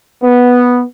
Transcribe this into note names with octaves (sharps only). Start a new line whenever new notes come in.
B3